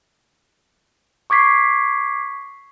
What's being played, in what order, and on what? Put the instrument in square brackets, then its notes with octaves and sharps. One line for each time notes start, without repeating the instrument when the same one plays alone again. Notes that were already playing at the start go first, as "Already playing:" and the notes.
[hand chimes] C#6 D6 G#6 B6 C7